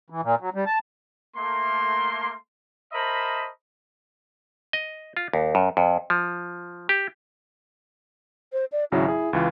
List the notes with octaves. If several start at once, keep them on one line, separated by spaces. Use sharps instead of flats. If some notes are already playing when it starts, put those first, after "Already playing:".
E3
A#2
F#3
G3
A5
A3 A#3 C6
A#4 C5 D#5 E5 A5 B5
D#5
F4
D#2
F#2
F2
F3
G4
C5
D5
G#1 C#3 F#3 E4
G#4
C#2 E3 F4